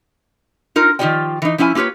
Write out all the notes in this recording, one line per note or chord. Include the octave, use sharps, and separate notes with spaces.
D#4 F4 A#4
D#3 F3 F4 G4 D5 G5
E3 D#4
F3 C#4 E4 F5 G#5
A#3 F4 G4 B4 C#5